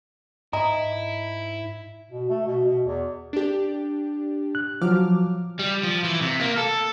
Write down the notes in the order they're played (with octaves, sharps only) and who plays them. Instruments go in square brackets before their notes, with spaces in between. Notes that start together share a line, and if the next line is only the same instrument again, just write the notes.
[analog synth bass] G#2 [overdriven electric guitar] E4 [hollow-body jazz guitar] D#5 [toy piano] A#5
[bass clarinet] B2
A3
B2
B2
E2
[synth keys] D4 G4
[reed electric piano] F#6
[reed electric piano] F3 F#3 [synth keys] D6 F6
[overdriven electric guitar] G3
F3
E3
C3
A#3
A4